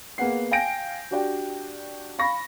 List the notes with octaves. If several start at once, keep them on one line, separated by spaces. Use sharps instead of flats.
A#3 B3 G#4 F#5 C7
F5 G5 G#5 G6 A#6 D7
D4 F#4 G4 D5 G5
F5 B5 C#6 A#6